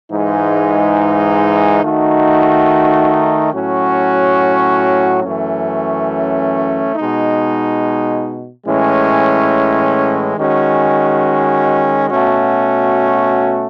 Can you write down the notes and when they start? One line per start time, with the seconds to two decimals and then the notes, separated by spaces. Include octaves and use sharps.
0.10 G#2 E3 G#3 D#4
1.82 D#3 A3 D#4 F#4
3.53 A2 F#3 C#4 F#4
5.24 F#2 E3 A3 C#4
6.96 B2 G#3 D#4
8.66 A2 E3 G#3 C#4
10.38 D#3 G#3 C#4 F#4
12.08 B2 A3 C#4 F#4